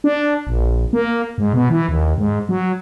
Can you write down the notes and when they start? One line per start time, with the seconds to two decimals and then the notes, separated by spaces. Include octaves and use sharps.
0.04 D4
0.47 A#1
0.93 A#3
1.38 G#2
1.53 B2
1.70 E3
1.89 D#2
2.18 G#2
2.49 F#3